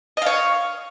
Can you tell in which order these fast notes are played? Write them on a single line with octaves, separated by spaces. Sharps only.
D#5 F5 C#5